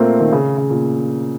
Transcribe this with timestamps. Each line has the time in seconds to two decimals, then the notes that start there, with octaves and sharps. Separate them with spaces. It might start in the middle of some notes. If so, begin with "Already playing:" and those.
Already playing: A#2 A3 A#3 C4
0.20 D#3
0.32 C#3
0.58 C#3
0.70 A#2